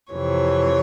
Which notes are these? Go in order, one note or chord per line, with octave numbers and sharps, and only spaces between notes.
F2 C3 E3 C#5